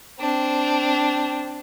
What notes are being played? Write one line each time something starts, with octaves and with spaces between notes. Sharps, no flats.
C4 D4